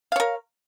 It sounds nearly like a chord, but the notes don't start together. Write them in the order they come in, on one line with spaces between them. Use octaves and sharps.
F5 C#5 A#4